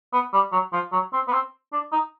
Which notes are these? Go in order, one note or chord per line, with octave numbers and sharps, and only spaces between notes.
B3
G3
F#3
F3
F#3
C4
B3
C4
D4
D#4